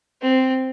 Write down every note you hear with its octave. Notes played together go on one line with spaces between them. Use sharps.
C4